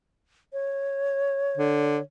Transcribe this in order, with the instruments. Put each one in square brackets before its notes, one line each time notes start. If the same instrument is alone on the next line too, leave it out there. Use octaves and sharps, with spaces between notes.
[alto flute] C#5
[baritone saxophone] D3